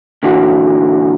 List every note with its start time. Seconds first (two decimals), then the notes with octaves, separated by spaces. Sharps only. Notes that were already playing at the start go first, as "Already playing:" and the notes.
0.23 A#2 D3 E3 F#4